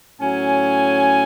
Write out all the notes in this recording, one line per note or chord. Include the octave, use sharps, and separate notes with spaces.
A2 F#3 C#4 G#5